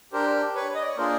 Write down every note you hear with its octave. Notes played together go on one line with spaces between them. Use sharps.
D4 G4 A#4 C5
B4 C#5
D#5
D5
C#5
A#3 D4 F4 G#4 A#4 C5